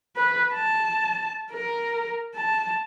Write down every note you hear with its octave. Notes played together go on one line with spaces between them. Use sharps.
B4
A5
A#4
A5